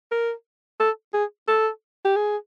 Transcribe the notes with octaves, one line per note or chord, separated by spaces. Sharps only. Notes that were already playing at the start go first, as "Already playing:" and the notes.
A#4
A4
G#4
A4
G4
G#4